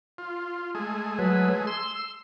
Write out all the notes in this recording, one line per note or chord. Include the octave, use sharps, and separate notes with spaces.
F4
G#3 A3 G#4
F#3 B4
C6 E6